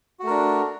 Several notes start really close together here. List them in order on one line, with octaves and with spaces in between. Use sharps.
F#4 A3 A#4 D4